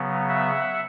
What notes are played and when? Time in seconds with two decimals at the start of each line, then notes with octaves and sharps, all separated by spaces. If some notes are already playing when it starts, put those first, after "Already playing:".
Already playing: C#3 F#3 B3
0.29 E5 F#5